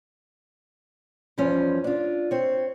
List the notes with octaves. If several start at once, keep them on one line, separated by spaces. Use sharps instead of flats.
E2 G2 F3 C#4
D4 F4
C4 C#5